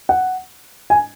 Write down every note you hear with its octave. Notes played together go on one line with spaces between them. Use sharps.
F#5
G#5